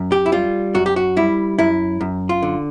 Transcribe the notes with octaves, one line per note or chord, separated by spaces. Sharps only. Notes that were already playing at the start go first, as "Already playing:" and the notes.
Already playing: F#2
G4
E4
G3 F4
F#2 F#4
G4
F#4
G3 E4
F#2 E4
F#2
F4
D3